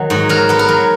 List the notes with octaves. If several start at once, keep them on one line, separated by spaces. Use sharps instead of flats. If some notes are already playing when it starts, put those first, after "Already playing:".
Already playing: D#3 F#3
G#2 F#4
F#3 A#4
B3 B4
A#4
F#3